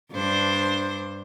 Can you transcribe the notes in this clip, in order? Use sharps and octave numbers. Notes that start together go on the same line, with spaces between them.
G2 D4 C5